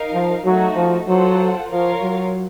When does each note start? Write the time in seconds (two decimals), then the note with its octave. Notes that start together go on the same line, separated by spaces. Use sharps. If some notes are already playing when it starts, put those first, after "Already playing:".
Already playing: D#4 A#4 F5
0.13 F3
0.44 F#3 A3 D#4 F#4
0.76 F3
1.08 F#3 F4 A4 C5 F#5
1.70 F3 F4 A#4 C#5 F5
2.02 F#3